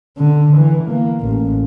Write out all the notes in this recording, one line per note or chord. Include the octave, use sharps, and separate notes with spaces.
D3
E3
A#3
A1